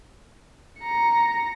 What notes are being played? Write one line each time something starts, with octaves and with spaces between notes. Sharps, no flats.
A#5 C#7